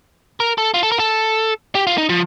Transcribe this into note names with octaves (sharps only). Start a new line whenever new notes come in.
A#4
A4
F4
A4
A#4
A4
G4
F4
D#4
F3